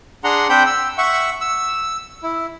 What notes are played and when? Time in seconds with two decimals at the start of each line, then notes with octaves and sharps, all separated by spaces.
0.24 D4 G#4 F#5 A#5 C6
0.49 C4 D4 C5 G5 B5 G6
0.66 E6
0.98 E5 F#5 C#6
1.41 E6
2.23 E4